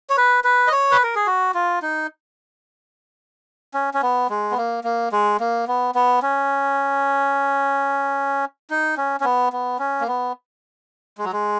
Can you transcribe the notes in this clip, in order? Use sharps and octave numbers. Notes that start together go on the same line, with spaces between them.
C#5
B4
B4
D#5
C#5
B4
A#4
G#4
F#4
F4
D#4
C#4
C#4
B3
G#3
B3
A#3
A#3
G#3
A#3
B3
B3
C#4
D#4
C#4
C#4
B3
B3
C#4
A#3
B3
G#3
F#3
G#3